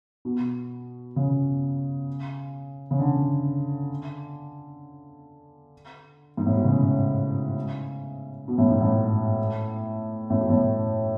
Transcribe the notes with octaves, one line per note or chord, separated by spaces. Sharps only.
B2
C#3
C#3
D3
G#2
A2
B2
C#3
B2
A2
G#2
A2
A2
B2
A2